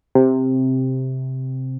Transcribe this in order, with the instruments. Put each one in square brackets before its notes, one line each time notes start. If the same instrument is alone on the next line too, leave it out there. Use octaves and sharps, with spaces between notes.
[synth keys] C3